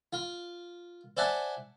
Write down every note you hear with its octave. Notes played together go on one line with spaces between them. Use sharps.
F4
C5 D5 E5 F#5 G#5 A5